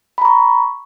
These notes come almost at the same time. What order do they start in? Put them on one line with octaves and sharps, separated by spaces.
B5 A#5 C#6